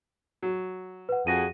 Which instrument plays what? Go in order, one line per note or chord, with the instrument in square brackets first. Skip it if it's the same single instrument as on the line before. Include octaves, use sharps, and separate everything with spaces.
[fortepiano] F#3
[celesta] B4 F#5
[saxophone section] F2 F#4 G#4 [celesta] A#6 D#7